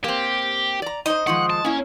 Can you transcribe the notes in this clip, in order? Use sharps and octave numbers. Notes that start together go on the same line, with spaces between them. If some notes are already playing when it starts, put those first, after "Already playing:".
A#3 C4 G4
D5 A#5
D#4 C5 D#5
D#3 F3 G#3 F#5
A5
A#3 C#4 E4